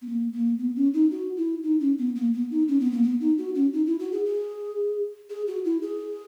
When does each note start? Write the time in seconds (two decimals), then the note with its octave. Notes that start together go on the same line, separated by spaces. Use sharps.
0.02 B3
0.07 A#3
0.33 A#3
0.58 B3
0.76 C#4
0.94 D#4
1.11 F#4
1.37 E4
1.63 D#4
1.80 C#4
1.98 B3
2.16 A#3
2.34 B3
2.51 D#4
2.68 C#4
2.80 B3
2.92 A#3
3.03 B3
3.21 D#4
3.38 F#4
3.55 C#4
3.73 D#4
3.86 E4
3.99 F#4
4.12 G#4
4.25 G#4
5.30 G#4
5.47 F#4
5.65 E4
5.82 G#4